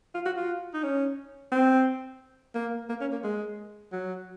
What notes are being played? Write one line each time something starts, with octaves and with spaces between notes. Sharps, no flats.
F4
F#4
F4
D#4
C#4
C4
A#3
A#3
C#4
A#3
G#3
F#3